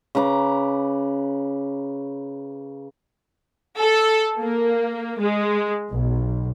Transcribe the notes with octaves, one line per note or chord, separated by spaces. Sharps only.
C#3 B4 A#5 D6
A4
A#3
G#3
B1